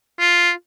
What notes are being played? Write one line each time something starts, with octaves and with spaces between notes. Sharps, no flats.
F4